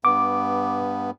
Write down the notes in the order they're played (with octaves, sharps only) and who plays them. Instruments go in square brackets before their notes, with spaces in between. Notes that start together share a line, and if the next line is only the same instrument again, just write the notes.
[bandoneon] G2 B3 [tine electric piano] D6